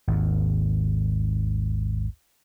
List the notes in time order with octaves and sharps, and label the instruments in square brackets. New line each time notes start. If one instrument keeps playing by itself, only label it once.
[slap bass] G#1 D#2